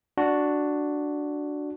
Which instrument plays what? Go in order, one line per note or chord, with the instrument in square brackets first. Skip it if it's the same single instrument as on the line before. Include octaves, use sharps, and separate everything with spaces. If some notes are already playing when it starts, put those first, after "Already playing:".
[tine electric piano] D4 F#4